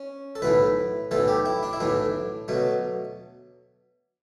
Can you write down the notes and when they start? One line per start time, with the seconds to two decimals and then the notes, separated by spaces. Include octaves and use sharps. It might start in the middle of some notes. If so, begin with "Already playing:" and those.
Already playing: C#4
0.36 A4
0.42 B1 A2 E3 B4
1.11 B1 A2 E3 A4
1.28 G4
1.46 E4
1.63 D4
1.73 E4
1.80 B1 A2 E3 D4
2.48 B2 F#3 A3